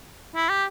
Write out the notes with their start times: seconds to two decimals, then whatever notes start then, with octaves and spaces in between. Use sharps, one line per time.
0.35 E4
0.49 G4